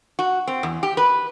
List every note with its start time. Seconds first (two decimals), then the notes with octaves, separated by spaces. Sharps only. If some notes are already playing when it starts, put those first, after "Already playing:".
0.19 F#4
0.47 C4
0.63 E2
0.83 G4
0.97 B4